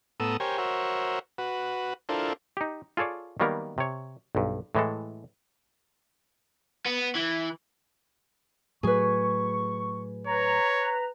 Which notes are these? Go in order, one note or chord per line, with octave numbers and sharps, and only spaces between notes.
A2 B3 A4 A#5 D#6 E6
G4 A#4 C5 C#5 G#5
F#4 A#4 C5 C#5 E5
F#4 B4
D4 E4 F4 A4 A#4 C5
D#4 G4
F4 G#4 A4 C#5 D5
D#3 F#3 G3 A#3 B3 A#4
C3 C#5
B1 G2
A2 E3 G#3 A4
B3
E3
A2 F#3 A3 G#4 B4 C#6
B4 C#5 A#5